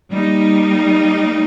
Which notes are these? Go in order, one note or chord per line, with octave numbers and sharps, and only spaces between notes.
G3 A#3 D#4